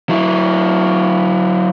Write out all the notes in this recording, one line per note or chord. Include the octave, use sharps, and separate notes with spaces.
F#3 E4